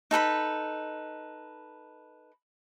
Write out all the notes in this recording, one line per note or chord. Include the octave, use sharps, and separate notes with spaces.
D#4 A4 B4 B5